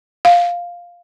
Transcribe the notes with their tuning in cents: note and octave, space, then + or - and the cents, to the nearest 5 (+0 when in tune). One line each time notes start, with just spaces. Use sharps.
F5 +5